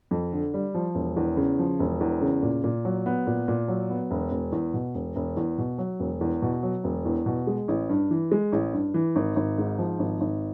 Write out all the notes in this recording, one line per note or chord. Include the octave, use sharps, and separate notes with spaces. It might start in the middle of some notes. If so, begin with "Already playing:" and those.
F2
D3
G3
F3
E1
E2
C#3
F3
E1
E2
C#3
A#2
A#2
F#3
B3
A#2
A#2
F#3
B3
E1
E1
E2
B2
E1
E1
E2
B2
F#3
E1
E2
B2
F#3
E1
E2
B2
G#3
A1
G2
E3
G#3
A1
G2
E3
G#1
G#1
G#2
F3
G#1
G#1